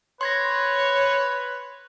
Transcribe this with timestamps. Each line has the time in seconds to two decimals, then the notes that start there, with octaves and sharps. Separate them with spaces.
0.21 B4 C#5 C6 G#6 A#6